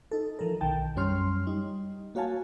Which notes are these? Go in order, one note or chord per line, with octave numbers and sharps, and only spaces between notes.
D#4 A4
E3 F3 A4 A#4
B1 D#3 G5 A5
F#2 G3 C#4 C#5 C6 F6
G3 D#4
A#3 F#4 C#5 F5 G#5 A5